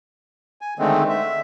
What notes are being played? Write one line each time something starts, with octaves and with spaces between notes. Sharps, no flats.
G#5
D3 D#3 G#3 A3 C4
E5